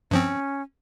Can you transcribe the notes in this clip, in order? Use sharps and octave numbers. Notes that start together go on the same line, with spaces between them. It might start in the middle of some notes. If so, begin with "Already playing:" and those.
G2 F3 C4 C#4